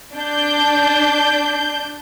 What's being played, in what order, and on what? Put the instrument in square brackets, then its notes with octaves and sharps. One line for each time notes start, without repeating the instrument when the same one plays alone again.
[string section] D4 G6